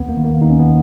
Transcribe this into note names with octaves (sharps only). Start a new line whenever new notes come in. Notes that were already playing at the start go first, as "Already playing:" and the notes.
Already playing: D#2 B3
A#3
D#3
A#3
D#2 D#4
C#4
B3